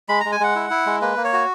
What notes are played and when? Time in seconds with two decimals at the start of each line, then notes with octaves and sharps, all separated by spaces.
0.09 G#3 B5
0.20 G#3 A#5
0.32 G#5
0.40 G#3 F#5
0.55 E4
0.70 E4
0.86 G#3
1.01 A#3 B4
1.17 A#3
1.24 C#5
1.33 F#4